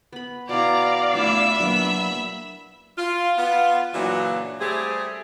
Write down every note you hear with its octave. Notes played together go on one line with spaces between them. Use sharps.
B3 B5
B2 E4 D5 F5 A#5
A3 B3 D4 E4 F4 E5 B5
F#3 A#3 B3 D4
F4
B3 F4
A#2 C#3 E3 F#3 D4 F#4
G3 A3 C4 G4 G#4